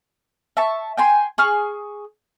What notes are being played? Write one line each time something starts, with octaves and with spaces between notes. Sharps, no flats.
E5 A5 C#6
G5 G#5 C6
G#4 C#6 F6